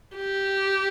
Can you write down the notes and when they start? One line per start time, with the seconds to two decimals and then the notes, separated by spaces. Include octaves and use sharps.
0.17 G4